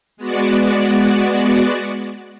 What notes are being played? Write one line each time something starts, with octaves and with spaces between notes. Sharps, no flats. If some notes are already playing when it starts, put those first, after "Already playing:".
G#3 B3 F#4 D5